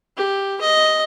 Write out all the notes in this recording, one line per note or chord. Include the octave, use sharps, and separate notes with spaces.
G4
D#5